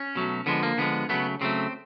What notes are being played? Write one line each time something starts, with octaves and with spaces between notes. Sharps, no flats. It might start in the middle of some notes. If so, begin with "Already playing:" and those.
Already playing: C#4
B2 F#3 A3
D3 F3 G#3 B3
A#3
D3 F3 G#3 B3
C#3 F#3 A3 B3
C#3 F#3 A3 C4